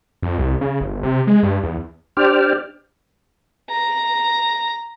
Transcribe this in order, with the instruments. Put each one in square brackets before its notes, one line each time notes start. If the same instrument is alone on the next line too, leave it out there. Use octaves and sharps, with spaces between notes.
[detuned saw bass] F2
C2
C#3
G1
C3
G#3
G2
E2
[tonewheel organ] D4 G4 C5 D5 G5 F6
[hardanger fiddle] A#5